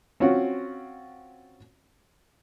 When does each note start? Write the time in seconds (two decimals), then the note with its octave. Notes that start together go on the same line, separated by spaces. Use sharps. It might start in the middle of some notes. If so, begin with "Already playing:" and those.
0.20 C4 C#4 F4 F#4